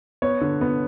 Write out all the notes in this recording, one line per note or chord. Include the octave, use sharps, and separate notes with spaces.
B3 C#5
D3
B3